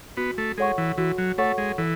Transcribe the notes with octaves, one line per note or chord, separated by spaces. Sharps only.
B3 F#4
A3
G#3 A4 C#5 F#5 C#6
E3
E3 F#4
F#3
A3 A4 C#5 F#5 C#6
G#3
E3 A4